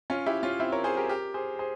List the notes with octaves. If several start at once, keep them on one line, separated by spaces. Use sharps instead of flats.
C#4 F4
E4 G4
C#4 F4
C4 E4
A#4 C#5
G#4 C5
G4 A#4
G4 A#4
G#4 C5
G#4 C5